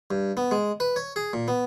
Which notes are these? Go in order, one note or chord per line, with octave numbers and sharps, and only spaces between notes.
G2
B3
G#3
B4
C#5
G#4
A#2
B3